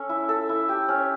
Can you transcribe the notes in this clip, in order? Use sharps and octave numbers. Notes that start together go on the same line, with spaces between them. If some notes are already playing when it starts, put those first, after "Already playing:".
Already playing: C#4 A4
E4
A4
E4
G4
C#4